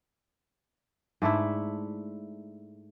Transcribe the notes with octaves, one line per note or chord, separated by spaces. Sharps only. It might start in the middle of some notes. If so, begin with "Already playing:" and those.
G#2 A3 D4 E4